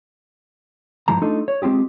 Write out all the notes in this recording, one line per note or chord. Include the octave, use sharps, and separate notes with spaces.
G2 E3 F3 G#3 A#5
A3 D4 D#4 F4 A4
C#5
G#3 C4 F4 G4 G#4